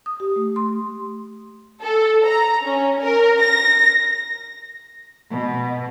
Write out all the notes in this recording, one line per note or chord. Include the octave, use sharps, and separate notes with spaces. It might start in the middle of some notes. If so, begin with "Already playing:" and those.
D#6
G4
A3
C6
A4
A#5
C#4
A#4
A#6
B2